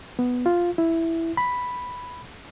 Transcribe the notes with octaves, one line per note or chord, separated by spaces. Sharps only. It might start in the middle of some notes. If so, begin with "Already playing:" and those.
B3
F4
E4
B5